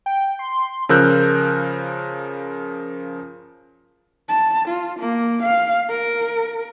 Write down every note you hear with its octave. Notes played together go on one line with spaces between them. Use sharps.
G5
C6
C#3 F3 A#4 E6 F#6 G6
A5
F4
A#3
F5
A#4